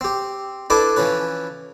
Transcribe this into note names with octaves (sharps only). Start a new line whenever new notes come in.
C4 G4
D4 E4 A4 B4 G#5 D6
E3 F3 C#4 B4